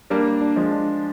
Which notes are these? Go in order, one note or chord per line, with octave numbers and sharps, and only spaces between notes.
G3 A#3 D4
D4
F3 G#3
D4